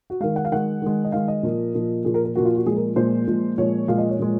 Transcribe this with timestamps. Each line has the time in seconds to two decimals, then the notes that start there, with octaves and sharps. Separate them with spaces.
0.10 F#4
0.20 D#3 G#3 F5
0.36 F#5
0.45 F5
0.52 D#3 G#3 F#5
0.82 D#3 G#3
1.04 D#5
1.12 D#3 G#3 F5
1.28 D#5
1.43 A#2 F3 A#3
1.74 A#2 F3 A#3
2.05 A#2 F3 A#3 G#4
2.14 A#4
2.25 A#4
2.35 A#2 F3 A#3 F#4
2.45 F4
2.56 F#4
2.66 A#2 F3 G#3 G#4
2.76 A#4
2.96 A#2 F3 G#3 C5
3.27 A#2 F3 G#3
3.58 A#2 F3 G#3 C#5
3.88 A#2 F3 G#3 F5
3.98 D#5
4.09 C#5
4.19 A#2 F3 G#3